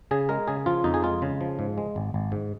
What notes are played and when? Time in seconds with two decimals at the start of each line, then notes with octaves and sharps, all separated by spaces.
0.11 C#3 G#4
0.29 G#3 A#4
0.48 C#3 G#4
0.66 F3 F4
0.84 F2 D#4
0.94 G#4
1.03 G#3 F4
1.22 C#3
1.41 F3
1.59 G#2
1.78 G#3
1.96 G#1
2.14 G#1
2.32 G#2